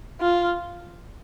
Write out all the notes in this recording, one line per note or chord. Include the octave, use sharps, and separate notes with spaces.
F4